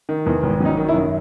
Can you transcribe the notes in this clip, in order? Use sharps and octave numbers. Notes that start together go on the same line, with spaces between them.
D#3
E2
G#1
F#3 C#4 D#4
D#3
E4
F#2